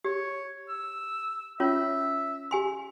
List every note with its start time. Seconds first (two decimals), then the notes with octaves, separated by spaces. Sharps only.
0.05 G4 C#5
0.69 E6
1.60 C#4 F4 C#5 E5
2.51 G4 G#5 C6